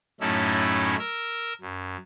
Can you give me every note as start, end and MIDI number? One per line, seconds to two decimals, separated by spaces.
0.21 0.96 42
0.21 0.96 45
0.21 0.96 57
0.21 0.96 61
0.21 0.96 63
0.21 0.96 64
0.99 1.53 70
0.99 1.53 88
1.61 1.97 42